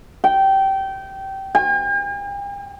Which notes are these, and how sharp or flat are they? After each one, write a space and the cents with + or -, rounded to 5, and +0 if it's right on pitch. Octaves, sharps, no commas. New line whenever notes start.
G5 -20
G5 +45